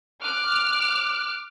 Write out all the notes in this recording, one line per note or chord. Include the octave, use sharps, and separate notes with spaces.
D6 F6 F#6